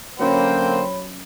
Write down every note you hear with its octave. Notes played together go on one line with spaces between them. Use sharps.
D3 F#3 A#3 C#4 C5 C#5 G5 B5